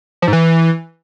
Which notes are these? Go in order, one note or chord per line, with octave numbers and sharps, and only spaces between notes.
F3
G#2
E3